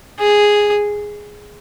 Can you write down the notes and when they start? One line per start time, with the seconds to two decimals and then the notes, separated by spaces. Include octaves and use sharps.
0.19 G#4